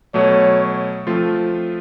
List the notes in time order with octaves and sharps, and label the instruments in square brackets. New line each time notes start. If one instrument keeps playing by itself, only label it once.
[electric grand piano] B2 F#3 A3 [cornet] C#5
[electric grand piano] F3 A3 C4 F4